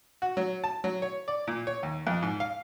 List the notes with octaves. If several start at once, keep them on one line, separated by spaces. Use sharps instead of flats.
F#4
F#3
A5
F#3
C#5
D5
A#2
C#5
D#2
F2
G#2
F5